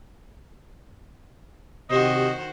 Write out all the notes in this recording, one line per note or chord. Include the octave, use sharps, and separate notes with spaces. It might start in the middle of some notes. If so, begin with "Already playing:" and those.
C3 D#3 F#4 G4 C5 D#5